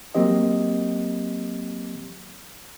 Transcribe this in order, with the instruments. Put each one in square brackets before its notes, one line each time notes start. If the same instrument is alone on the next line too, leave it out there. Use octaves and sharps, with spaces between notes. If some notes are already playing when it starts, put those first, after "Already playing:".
[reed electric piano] F#3 A#3 C4 G4 D#5